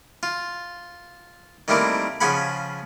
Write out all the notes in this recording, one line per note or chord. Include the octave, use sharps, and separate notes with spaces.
F4
D#3 G3 A3 A#3 C4 E4
C#3 F3 G#4 F#5 B5